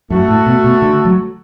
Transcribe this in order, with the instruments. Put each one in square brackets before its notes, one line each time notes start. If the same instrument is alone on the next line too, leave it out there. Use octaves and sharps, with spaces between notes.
[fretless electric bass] F#2 [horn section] A3 F#4 A4
[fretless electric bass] A2
B2
B2
D3
F#3